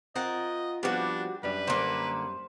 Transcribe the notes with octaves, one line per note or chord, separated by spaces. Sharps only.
C4 F4 A#4 D#5 F#5
F3 G3 B3 C4 D4 F#4
F#2 G3 D4 B4
D3 A#3 C5